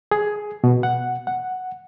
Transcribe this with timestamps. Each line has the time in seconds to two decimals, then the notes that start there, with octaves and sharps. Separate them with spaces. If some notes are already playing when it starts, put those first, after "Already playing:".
0.11 G#4
0.64 B2
0.83 F#5
1.27 F#5